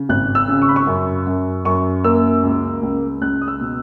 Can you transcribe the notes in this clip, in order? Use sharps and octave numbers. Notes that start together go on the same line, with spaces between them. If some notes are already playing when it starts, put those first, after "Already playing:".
Already playing: C#3
G#1 F#6
E6
C#3
C#6
B5
C#6
F#2
F#2
F#2 C#6
A#3 E6
C#2
C#2
C#2 F#6
D#6
E6
B2